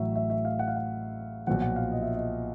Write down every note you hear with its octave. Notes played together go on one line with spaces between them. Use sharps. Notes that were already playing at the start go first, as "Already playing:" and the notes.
Already playing: A1 A2 F#3 E5
E5
E5
F5
F#5
F5
F#5
B1 A#2 F3 F#5
F#5
F5
D#5
E5
D#5